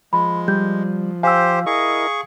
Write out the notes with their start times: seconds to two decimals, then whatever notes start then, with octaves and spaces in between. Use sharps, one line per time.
0.13 F3 G#3 B5
0.48 G3 G6
1.23 G4 C5 F5 G#5 E6
1.66 E4 G#4 A#4 D#5 C#6